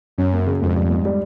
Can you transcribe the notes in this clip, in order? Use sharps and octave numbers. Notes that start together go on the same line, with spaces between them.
F#2 C#4
A#3
C#3
F2 G#2
G3
G#2
G3